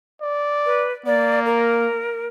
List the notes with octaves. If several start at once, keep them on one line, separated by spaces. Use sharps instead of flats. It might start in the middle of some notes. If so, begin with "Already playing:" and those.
D5
B4
A#3 D5
A#4